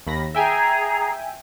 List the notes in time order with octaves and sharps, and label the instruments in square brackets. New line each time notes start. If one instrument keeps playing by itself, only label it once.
[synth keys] D#2 B5 A#6
[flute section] G#4 A#5 [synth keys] E5 G5 G#5